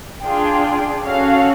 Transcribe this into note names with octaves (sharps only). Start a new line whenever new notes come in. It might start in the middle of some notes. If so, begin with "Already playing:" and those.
D4 F4 G#4 G5
C#4 F#4 A4 F5